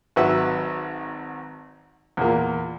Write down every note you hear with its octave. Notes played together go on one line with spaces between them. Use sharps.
G#1 F#3 B4 E5 F#5
E2 A#2 A#3